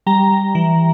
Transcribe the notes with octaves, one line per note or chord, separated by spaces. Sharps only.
G3 A#5
G3
E3